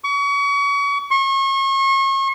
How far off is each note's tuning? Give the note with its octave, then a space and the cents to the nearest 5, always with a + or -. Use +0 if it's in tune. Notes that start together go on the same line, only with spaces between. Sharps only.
C#6 +35
C#6 -35